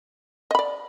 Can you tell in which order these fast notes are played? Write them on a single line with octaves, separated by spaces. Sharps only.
D#5 B5 D5